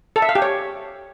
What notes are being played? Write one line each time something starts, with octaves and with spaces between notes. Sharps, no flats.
A4
E5
F5
G4
C#5